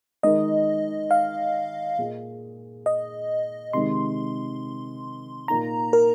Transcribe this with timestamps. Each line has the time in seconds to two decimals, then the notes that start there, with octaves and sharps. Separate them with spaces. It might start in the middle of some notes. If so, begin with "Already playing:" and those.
0.23 D#3 G#3 D#4 A#4 D#5
1.11 F5
1.98 A#2 A#3 G#4
2.86 D#5
3.73 C3 D#3 G#3 C6
5.48 A#2 A#3 D#4 A#5
5.93 A#4